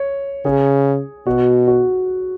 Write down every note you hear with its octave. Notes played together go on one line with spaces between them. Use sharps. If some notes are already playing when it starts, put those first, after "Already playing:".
Already playing: C#5
C#3 G#4
B2 F#4
F#4